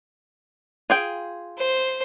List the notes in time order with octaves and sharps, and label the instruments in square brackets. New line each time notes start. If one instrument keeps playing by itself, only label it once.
[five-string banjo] F4 G#4 G5
[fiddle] C5